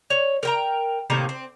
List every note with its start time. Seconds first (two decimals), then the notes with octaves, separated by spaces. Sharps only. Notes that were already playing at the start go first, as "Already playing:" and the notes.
0.10 C#5
0.43 A#4 G5 A#5
1.10 A2 C3 D#3 A#3
1.29 C4